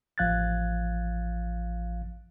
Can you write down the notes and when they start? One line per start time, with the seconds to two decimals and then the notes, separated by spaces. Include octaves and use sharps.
0.18 A1 F3 F5 F#6 G#6 A6